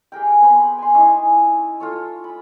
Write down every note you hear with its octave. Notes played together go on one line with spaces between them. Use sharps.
G4 G#4 A#4 G5
B3 C4 B5
G#5 C6
C#4 D#4 E4 D#5
F4 A4 C#5
B5